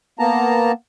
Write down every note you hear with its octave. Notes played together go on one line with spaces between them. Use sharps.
A#3 B3 A5 A#5